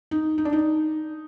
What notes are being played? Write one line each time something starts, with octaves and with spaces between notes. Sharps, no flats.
D#4
D#4
D4
D#4